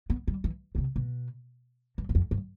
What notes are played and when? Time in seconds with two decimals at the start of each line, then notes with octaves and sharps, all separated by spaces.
0.10 B3
0.28 G3
0.44 E3
0.75 B2
0.78 C3
0.96 B2
1.98 G2
2.09 E2
2.15 F2
2.31 G2